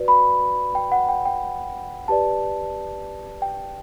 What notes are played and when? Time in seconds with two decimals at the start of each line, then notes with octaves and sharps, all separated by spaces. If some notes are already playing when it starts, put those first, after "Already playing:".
Already playing: F#4 B4 D5
0.08 B5
0.75 G5
0.92 F#5
1.09 G5
1.26 G5
2.08 G4 B4 D5 A5
3.42 G5